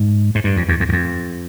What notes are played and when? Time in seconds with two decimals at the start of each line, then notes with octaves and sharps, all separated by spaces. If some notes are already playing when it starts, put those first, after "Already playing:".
Already playing: G#2
0.35 G#2
0.44 G2
0.56 F2
0.69 E2
0.80 F2
0.89 E2
0.93 F2